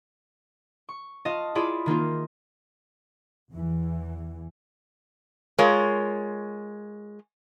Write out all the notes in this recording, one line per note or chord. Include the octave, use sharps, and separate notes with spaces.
C#6
F4 D#5 F5 A5
E4 F4 G#4 D5 B5
D#3 A#3 D#4 F4
E2 E3
G#3 F4 A#4 C#5